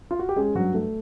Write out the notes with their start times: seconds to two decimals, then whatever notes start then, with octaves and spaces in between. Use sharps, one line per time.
0.11 F4
0.19 F#4
0.29 G4
0.36 G#3 C#4 G#4
0.55 G2 F#3 F#4
0.74 A3